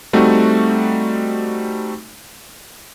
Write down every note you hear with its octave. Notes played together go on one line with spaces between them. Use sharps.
G3 A3 C4 D#4 F#4